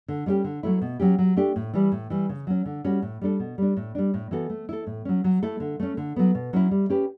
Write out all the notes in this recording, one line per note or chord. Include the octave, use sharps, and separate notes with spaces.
D3
G3 C#4 E4 G4
D3
F#3 A3 E4
B2
F#3 C#4 G4
F#3
A3 D4 G4
A2
E3 G3
A2
E3 G3
C#3
F#3 C#4
D3
G3 C#4 F#4
A2
G3 D4 A4
B2
G3 D4
A2
G3 D4
A2
E3 B3 F#4 A4
A3
E4 A4
A2
F#3 C#4
F#3
A3 E4 A4
D3
A3 C#4
D3
F#3 B3
B2
F#3 C#4 E4
G3
C#4 G4 B4